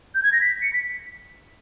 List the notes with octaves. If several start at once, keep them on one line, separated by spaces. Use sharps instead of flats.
G6
G#6
A#6
B6
C#7
B6